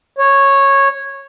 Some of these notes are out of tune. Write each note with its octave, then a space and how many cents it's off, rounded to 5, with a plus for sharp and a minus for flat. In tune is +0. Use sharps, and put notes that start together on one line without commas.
C#5 -10